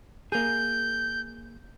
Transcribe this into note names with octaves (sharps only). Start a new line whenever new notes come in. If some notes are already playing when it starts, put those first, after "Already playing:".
A#3 G#4 G6